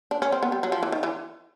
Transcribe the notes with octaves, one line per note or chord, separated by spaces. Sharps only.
D4
C#4
C4
B3
G3
F#3
F3
E3
D#3
E3